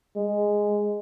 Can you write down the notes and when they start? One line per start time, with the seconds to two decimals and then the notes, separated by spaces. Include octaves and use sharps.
0.17 G#3